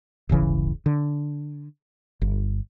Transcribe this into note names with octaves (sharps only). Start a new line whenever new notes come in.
D1 G1 C#3 E3
D3
G1